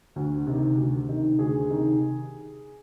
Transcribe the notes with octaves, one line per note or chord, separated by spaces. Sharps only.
D2
C3 D#3
D2
C3 D#3
D2 G#4
C3 D#3